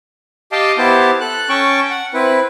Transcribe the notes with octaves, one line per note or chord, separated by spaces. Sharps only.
G4 D#5 F5 G5 A5
B3 E4 G4 C5 A5
A4 F#6
C#4 G5 A5 C#6
F#5
C4 E4 B4